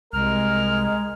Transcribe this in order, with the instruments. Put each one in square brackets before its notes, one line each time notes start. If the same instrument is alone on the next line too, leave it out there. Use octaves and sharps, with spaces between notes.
[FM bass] C2 [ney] G#3 [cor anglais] A#4 [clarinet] F6